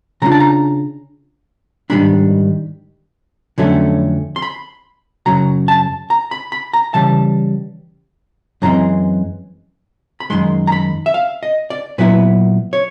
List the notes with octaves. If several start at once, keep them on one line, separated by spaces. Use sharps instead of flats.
C#3 F3 A3 D4 F4 A#5
A5
A#5
G#2 D#3 G3 A#3 D4 B5
F2 D3 F#3 A3 C#4
C6
B5
F#2 C#3 F#3 A#5
A5
A#5
B5
B5
A#5
C#3 E3 G3 A5
F#2 C#3 E3 G#3 C4 A#5
B5
F#2 D#3 G#3 C6
A#5
B5
E5
F5
D#5
D5
A#2 F#3 B3 E4 B4
C#5